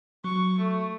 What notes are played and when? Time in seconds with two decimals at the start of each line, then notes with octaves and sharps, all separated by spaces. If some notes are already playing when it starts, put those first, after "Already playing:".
0.24 F#3 C#6
0.58 A3